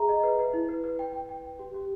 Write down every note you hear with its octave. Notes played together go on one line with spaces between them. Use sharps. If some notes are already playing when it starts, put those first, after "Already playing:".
Already playing: G#4 E5 A#5
D#5
B4
B4
E4
B4
B4
G5
G5
G5
G5
G4
G4